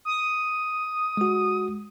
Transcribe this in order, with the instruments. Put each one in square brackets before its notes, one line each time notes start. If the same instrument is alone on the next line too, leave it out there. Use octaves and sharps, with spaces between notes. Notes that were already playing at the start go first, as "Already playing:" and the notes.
[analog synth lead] D#6
[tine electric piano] G#3 F#4